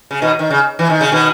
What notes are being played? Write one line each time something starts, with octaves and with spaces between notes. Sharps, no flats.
C#3
B2 D#3
D#3
C#3
E3
D#3
C#3
B2 D#3